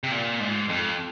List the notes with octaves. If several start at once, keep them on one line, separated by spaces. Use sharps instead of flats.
C3
A#2
G#2
F2